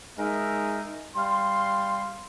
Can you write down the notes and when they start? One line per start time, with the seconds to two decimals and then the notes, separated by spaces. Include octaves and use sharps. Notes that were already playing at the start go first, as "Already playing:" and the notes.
0.19 G#3 D#4 A#4 D#5 E5
1.16 G3 F5 C6